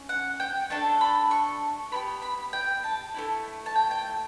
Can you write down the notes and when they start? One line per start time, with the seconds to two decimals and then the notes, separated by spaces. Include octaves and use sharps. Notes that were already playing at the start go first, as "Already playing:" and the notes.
Already playing: C#4
0.09 F#5
0.40 G5
0.70 A3 D4 A4 A5
1.01 B5
1.31 C#6
1.91 B3 E4 G4 B5
2.22 B5
2.53 G5
2.84 A5
3.14 A3 C#4 E4
3.66 A5
3.75 G5
3.91 G5